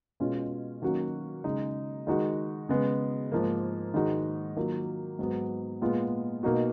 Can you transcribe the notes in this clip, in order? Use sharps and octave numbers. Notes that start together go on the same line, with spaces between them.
B2 G#3 C#4 F4
D#3 F#3 A#3 C#4 F#4
C#3 G#3 D#4
D#3 G#3 D#4 F#4
C#3 G#3 B3
G#2 F3 A#3
G#2 D#3 G#3 D#4 F#4
D#3 F#3 A#3 F4
G#2 F#3 B3
A#2 G#3 B3 F4
B2 A#3 D#4 F#4